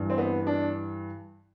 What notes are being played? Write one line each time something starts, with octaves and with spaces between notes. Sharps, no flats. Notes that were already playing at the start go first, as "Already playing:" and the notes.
Already playing: G2 E3
C4
B3
D4